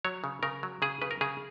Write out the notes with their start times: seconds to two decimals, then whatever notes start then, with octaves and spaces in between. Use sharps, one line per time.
0.05 F#3 C#5
0.24 C#3
0.43 C#3 A#4
0.63 F#3
0.82 C#3 G#4
1.02 C#3 B4
1.11 A#4
1.21 C#3 G#4